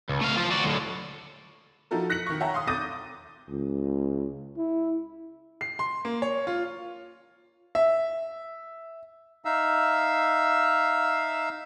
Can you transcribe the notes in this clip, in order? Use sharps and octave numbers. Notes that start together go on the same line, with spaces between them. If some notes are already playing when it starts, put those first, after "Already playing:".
C#2
A3 F5
F4 A5
F#4 D5
D2 A2
F3 D#4 E4 F#4 A4 A#4
F#6 A#6 B6 C#7 F#7
D#3 C#6
C#5 E5 F#5 G5 A5 A#5
F5 C6 D#6
D6 D#6 G6 A6 A#6 D#7
C#2
E4
C7
C6
A#3
C#5
F4
E5
D#4 E5 F5 E6